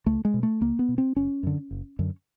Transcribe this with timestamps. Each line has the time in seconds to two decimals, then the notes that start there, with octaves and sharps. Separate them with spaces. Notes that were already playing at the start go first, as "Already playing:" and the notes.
0.06 C#2 A3
0.25 G#3
0.34 B2
0.43 A3
0.61 C#2 A#3
0.79 B3
0.89 B2
0.98 C4
1.16 F#1 C#4
1.43 F#2 D3
1.71 F#1
1.99 F#2 D3